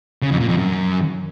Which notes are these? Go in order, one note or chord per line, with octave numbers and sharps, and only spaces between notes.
C#3
F2
A#2
F2
F#2